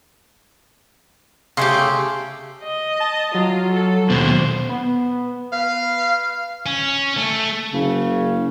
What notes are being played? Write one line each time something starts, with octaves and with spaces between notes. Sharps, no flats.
C#3 A3 G4 G#5 C6 C#6
D#5
A5
F#3 F4
A4
D#2 B2 C5
B3
B4 F5
C#4
A3
F#1 C#3